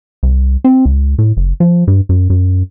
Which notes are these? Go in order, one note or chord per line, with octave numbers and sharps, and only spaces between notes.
C2
C4
C#2
A2
F#1
F3
G2
F#2
F#2